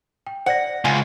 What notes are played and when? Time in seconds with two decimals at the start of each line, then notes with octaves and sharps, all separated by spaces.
0.27 G5
0.46 C5 D5 F#5 A#6
0.85 C#2 F4 G#5